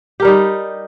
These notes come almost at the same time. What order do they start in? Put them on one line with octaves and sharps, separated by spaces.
G4 A#4 G3 D#4